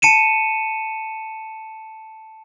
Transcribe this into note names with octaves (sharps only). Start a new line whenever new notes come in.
A5 C#7 D#7 E7